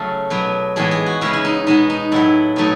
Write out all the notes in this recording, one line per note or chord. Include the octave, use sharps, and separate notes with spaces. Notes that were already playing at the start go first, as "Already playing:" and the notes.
Already playing: C#3 F#3 A3 A4
B2 F#3 B3
A2 E3 G#3 B3 G#4
G#4
F#4
C#3 G#3 B3 E4
E4
D#4
B2 G#3 B3 D#4
D#4
A2 F#3 B3 E4
B2 F#3 A3 D#4